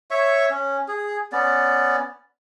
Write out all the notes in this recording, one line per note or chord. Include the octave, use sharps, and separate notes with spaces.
C#5 E5 C#6
C#4
G#4
B3 C#4 D5